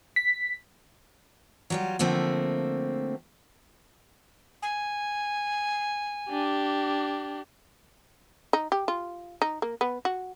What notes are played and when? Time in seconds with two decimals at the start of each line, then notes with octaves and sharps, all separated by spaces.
0.16 B6
1.70 F#3 G3 F4
1.99 D3 F3 A3 A#3 C4
4.62 G#5
6.29 D4 G4
8.53 D#4
8.72 G4
8.88 F4
9.42 D#4
9.62 A#3
9.81 B3
10.05 F#4